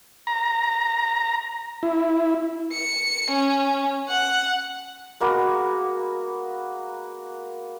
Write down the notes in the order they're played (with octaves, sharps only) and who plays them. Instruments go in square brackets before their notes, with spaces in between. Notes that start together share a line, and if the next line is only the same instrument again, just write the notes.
[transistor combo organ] A#5
E4
[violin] C#7
C#4
F#5
[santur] G#3 A#3 B3 F#4